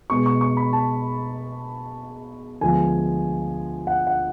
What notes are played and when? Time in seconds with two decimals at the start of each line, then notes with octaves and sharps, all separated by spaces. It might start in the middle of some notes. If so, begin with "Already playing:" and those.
0.10 B2 G#3 B3 C#6
0.26 C#6
0.41 C#6
0.57 B5
0.73 A5
2.61 D2 D3 F3 G#3 B3 G#5
3.87 F#5
4.07 F#5